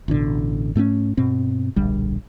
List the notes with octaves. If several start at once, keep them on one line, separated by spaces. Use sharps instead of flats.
A1 B2 D3
G#2 A3 B3 C#4
G2 B2 C4
D1 A#1 D3 G3